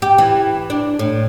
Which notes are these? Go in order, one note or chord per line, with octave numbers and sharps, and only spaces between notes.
G4
E3
D4
A2